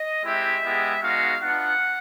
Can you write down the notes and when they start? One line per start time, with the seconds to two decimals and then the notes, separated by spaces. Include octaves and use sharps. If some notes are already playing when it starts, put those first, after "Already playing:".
Already playing: D#5
0.24 G#3 C4 E4 G4 E5
0.63 G#3 B3 E4 G4
1.02 G#3 B3 D#4 F#4 F5
1.40 B3 D4 F4 F#5